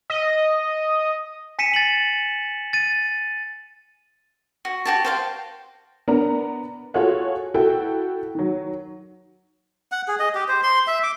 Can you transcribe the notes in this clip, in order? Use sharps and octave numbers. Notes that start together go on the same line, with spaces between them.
D#5
G#5 B6 C#7 D#7 E7
A6 F#7
A6 D#7
F#4
F#4 G4 A5
C5 F5 G5
B3 D4 A#4 A#5
F4 F#4 G#4 A4 C#5 F#5
E4 F#4 A4 G5
D#3 F#3
F#5
G#4
D#5
G4
C5
C6
E5
D6